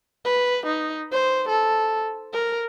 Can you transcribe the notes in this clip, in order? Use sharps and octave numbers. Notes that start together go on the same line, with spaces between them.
B4
D#4
C5
A4
A#4